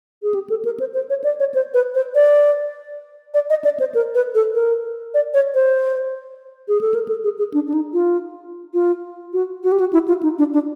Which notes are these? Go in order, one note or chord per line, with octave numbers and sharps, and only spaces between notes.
G#4
G4
A4
A#4
C5
C5
C#5
D5
C#5
C5
B4
C5
D5
D5
D#5
D5
C5
A#4
B4
A4
A#4
D5
C#5
C5
G#4
A4
A#4
A4
G#4
G#4
D4
D4
D#4
F4
F4
F#4
F#4
G4
F#4
E4
F4
D#4
D4
D4